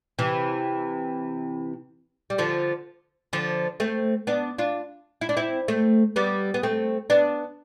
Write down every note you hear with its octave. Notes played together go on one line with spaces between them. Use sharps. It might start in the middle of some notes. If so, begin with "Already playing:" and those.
C3 E3
G3
D3 F3
D3 F3
A3 C4
B3 D4
D4 F4
E4
D4
C4 E4
A3 C4
G3 B3
B3
A3 C4
B3 D4